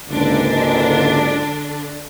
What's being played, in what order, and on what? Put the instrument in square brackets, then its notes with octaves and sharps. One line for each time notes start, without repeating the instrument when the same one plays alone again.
[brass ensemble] F#1 C#2 G#2 [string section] D3 D4